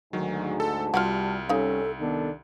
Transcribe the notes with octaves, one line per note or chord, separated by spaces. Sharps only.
D2 G#2 D#3 F#3
A4 A5
C2 G3 F4 F#4 F5 F#5 F6
G3 C#4 D#4 A4 F5
D#3 B3 D4 A4